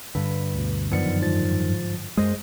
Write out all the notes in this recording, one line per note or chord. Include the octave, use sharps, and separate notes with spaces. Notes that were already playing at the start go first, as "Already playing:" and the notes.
G2 D3 B4
D2 B2
F#2 D#3 F3 B3 D5 C#7
G#2 F3 A6
F#2 G#3 G#4 C5 D#5